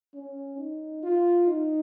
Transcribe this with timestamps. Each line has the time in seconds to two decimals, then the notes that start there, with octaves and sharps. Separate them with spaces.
0.14 C#4
0.58 D#4
1.03 F4
1.47 D#4